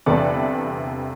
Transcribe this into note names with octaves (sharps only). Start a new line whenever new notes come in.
G1 E2 C3 A4 B4 D5